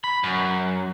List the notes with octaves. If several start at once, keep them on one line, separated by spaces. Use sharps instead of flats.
B5
F#2